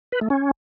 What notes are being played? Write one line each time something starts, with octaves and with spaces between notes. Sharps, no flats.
B4
A3
C#4